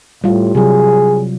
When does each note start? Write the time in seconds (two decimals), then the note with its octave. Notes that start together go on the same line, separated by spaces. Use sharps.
0.24 A2 G3 F4 G4
0.55 C3 F#3 G#4